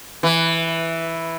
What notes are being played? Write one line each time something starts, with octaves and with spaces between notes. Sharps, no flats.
E3